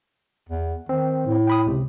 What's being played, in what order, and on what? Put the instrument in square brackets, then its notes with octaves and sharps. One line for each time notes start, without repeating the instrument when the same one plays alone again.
[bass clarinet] E2
[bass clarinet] D#3 [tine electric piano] C4
[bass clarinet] A2
[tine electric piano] G5 B5 D#6
C#2 C3